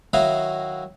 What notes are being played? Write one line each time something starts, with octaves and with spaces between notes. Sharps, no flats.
D#3 F#3 E4 F#4 D#5 F5